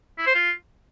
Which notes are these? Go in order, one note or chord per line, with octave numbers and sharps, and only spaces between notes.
E4
C5
F4